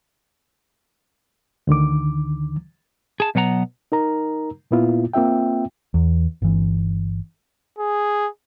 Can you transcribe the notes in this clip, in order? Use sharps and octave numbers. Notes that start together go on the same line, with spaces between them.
D2 D3 D#3 D6
G#4 A5
B2 F#3 B3 F#5 A#5
D#4 A#4 A#5
A#2 A#3 B3 E4 F4
A#3 C4 F4 E5 G5
E2
G1 E3
G#4